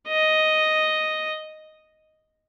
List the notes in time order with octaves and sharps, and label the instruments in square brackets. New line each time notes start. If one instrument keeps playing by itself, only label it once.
[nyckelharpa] D#5